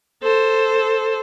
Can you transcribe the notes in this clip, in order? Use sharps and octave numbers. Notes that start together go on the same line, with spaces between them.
A4 C5